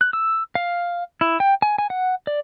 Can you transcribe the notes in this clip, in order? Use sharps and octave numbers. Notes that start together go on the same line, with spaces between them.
F#6
E6
F5
E4
G5
G#5
G#5
F#5
D5